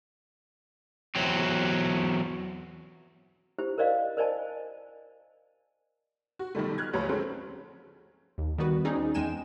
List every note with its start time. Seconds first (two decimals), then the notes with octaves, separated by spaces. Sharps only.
1.15 E2 F#3 C4
3.58 E4 G4 C5
3.78 A#4 C5 D5 D#5 F5
4.17 A#4 C5 D5 D#5 G#5 A5
6.39 F#4
6.55 B1 D#3 G3 A3
6.78 F6 F#6 G#6
6.93 F#1 D2 F3 B4 C#5 A#5
7.09 F3 G#3 A3 C4 C#4 F#4
8.38 D#2
8.58 D#3 G3 B3 F#4 B4
8.85 C4 C#4 D#4 G#4 D5
9.14 E2 G#3 G5 G#5 E7